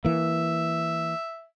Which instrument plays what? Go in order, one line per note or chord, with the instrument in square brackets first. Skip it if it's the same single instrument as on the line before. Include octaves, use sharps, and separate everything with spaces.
[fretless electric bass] E3 A#3 [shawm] E5